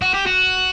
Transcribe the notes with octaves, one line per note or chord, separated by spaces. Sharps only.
F#4
G4
F#4